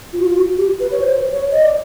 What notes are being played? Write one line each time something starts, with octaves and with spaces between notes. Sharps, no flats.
F4
F#4
F4
F#4
G4
B4
C#5
C5
C#5
D#5
D5